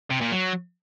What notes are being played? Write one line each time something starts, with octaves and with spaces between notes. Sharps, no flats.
C3
A#2
F#3